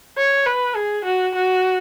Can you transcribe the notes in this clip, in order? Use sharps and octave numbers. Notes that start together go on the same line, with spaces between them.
C#5
B4
G#4
F#4
F#4